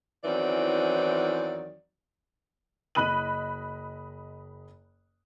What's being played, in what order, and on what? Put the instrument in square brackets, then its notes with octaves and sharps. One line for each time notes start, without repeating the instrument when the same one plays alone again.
[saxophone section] E2 D#3 E3 F#3 C4 D5
[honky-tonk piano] F#1 D#5 B5 F#6 D#7 F#7